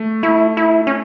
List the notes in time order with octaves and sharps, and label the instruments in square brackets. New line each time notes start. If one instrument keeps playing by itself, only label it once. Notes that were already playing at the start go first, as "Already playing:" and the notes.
Already playing: [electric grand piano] A3
[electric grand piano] A3 [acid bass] E4
[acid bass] E4
C#4